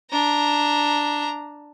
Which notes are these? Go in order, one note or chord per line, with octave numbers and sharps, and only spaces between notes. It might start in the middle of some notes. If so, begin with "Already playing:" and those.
D4 A#5